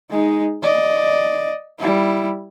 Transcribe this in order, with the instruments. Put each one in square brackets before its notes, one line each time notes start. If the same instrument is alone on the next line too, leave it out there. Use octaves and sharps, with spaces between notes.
[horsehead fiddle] G#3 D#4
D5 D#5
G3 E4